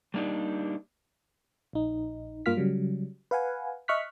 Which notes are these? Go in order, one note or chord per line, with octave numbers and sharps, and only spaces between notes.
G3 A#3 D4 D#4 G4
A#1 D#4
G2 A#3 F4 F5 F6 B6
C#3 F#3 G3
B4 F5 F#5 G#5
D#5 E5 C#6 F6 F#6 B6